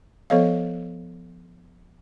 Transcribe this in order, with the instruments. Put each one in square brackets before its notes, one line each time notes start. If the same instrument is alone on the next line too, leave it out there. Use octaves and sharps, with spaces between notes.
[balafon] F3 B3 A4 C#5 D#5 F5